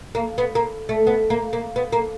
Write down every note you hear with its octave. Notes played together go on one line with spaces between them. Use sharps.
A#3
B3
A#3
A3
B3
A#3
A#3
B3
A#3